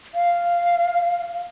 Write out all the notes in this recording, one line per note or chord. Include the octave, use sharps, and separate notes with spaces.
F5